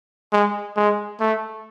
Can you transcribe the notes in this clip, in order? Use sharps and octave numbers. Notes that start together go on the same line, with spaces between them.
G#3
G#3
A3